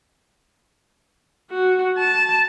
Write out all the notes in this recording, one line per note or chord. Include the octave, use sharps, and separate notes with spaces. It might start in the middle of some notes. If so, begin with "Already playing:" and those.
F#4
A5